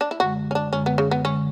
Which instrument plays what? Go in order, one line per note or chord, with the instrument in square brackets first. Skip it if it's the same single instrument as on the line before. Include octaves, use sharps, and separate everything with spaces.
[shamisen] D4
E4
[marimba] F#2 D3 G#3 [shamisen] F#4
[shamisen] C#4
D4
[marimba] F#2 D3 G#3 [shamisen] C#4
[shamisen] B3
C#3
B3
[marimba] F#2 D3 G#3 [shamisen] C#4